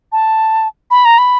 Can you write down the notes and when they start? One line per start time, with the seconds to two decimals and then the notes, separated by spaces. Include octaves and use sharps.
0.12 A5
0.91 B5
1.05 A#5
1.18 B5